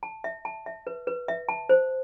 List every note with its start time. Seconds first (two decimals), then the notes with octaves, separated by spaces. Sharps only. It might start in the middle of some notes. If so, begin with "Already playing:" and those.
0.03 A5
0.24 E5
0.45 A5
0.66 E5
0.87 B4
1.07 B4
1.28 E5
1.49 A5
1.69 C5